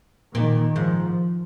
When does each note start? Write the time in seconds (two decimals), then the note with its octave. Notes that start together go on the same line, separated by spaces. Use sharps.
0.34 A#2 D#3
0.76 G#2 F3